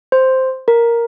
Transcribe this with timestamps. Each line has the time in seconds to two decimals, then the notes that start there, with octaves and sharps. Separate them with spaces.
0.12 C5
0.68 A#4